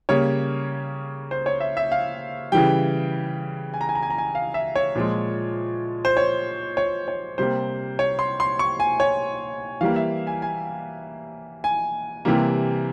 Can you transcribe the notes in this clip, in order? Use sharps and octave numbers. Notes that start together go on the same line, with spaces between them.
C#3 G3 A#3 C#5
C5
C#5
E5
E5
F5
C#3 E3 G3 G5
G#5
A#5
G#5
A#5
G#5
A#5
G#5
F5
E5
C#5
A#2 F3 G#3
C5
C#5
C#5
C#5
C3 G3 A#3 C5
C#5
C6
C6
C#6
G#5
C#5
E3 G3 A#3 F5
E5
G#5
G#5
G#5
C3 E3 G3 A#3